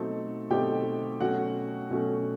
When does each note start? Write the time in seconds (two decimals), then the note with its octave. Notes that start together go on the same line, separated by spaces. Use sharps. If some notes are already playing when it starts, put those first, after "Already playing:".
Already playing: B2 F#3 A3 C4 D#4 A4
0.50 B2 F#3 A3 C4 D#4 G4 G5
1.20 B2 F#3 A3 C#4 F#4 F#5
1.90 B2 F#3 A3 C#4